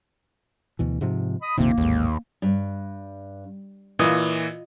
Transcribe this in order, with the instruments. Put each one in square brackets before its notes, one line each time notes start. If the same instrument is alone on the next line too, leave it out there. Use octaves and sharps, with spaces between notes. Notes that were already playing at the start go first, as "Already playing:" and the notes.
[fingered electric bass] D2 B2 E3
G#2 C3 F3
[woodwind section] D#5 B5 D#6
[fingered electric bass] A#1 F2 D#3 [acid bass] C3 [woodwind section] A#3
[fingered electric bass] A1 G#2 [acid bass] D#2
[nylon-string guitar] G2
[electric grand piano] A#2 E3 D#6 [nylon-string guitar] F4 D#5